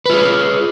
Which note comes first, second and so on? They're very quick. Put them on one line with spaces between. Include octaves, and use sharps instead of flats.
B4 F4 G#4